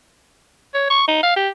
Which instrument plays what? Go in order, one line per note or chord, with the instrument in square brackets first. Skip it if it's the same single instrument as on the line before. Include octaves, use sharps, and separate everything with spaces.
[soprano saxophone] C#5
C#6
D#4
F5
G4